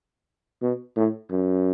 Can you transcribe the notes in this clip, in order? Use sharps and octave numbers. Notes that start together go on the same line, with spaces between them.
B2
A2
F#2